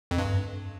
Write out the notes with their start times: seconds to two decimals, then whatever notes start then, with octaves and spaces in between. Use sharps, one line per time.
0.11 F2
0.18 G2